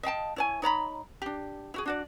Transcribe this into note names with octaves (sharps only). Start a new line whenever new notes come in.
D#5 F5 G5 A5
E4 C#5 G#5
D#4 C#5 A#5 B5
D4 G4
E4 F#4 G#4
D4 F#4 D5